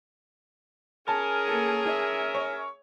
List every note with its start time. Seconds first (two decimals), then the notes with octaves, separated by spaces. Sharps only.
1.08 C#4 G#4 A#4 A5
1.47 A#3 A4
1.85 E5
2.35 C#5